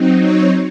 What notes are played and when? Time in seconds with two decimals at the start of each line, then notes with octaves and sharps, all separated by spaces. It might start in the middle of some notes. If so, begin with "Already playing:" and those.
Already playing: F#3 C4 D#4
0.21 C#5